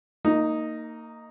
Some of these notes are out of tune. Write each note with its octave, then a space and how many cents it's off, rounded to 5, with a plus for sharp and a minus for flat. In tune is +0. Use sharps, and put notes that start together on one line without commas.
A#3 -25 D#4 +0